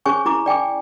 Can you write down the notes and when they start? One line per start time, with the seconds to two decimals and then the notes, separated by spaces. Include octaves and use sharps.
0.06 C#4 G#4 C5 C#5 G#5 C#6
0.26 E4 A#5 D6
0.46 D5 G5 G#5 D6